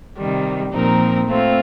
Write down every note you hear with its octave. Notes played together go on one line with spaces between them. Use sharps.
C3 D#3 G3
A#2 F3 C4 D#4 A#4
A3 C4 F4